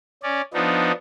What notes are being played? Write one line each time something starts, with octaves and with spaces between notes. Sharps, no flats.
C#4 D5
F3 B3 D4 D#4